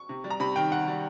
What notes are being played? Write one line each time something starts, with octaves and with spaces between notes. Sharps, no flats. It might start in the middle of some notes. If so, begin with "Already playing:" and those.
Already playing: C#6
C3
G3
A#5
C3 B5
D#3 G5
D#3 F#5
G3